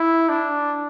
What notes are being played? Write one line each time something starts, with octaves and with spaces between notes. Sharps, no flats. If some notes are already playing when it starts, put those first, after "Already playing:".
Already playing: E4
D4